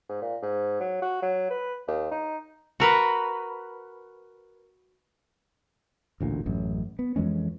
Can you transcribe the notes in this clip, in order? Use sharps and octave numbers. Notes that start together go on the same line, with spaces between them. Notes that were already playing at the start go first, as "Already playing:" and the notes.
G#2
A#2
G#2
F#3
F#4
F#3
B4
D#2
D#4
F#4 A#4 B4
A1 D2 A#2
A1 F#2
B3
F2 E3 G#3 C#4